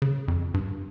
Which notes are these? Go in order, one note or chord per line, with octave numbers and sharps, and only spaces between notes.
C#3
F2
G2